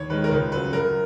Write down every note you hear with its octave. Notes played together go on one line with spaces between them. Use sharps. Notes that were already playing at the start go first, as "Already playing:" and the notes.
Already playing: D#2 C#5
D#3 G#3 B4
A#4
C#2 B4
C#3 F#3 B4
F#2 A#4